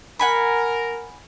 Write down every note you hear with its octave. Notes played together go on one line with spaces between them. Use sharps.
A#4 F#5 G#5 B5